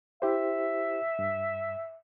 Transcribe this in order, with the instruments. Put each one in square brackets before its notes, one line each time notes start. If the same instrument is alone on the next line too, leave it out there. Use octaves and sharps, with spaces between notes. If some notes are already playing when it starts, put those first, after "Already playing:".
[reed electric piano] E4 G4 C5 [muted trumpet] E5
[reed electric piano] G2